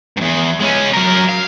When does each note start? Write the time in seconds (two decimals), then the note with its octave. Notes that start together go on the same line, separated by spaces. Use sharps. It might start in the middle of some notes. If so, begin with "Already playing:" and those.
0.17 E2 G#2
0.60 G#3 C#4
0.93 F#3 A#4
1.29 F5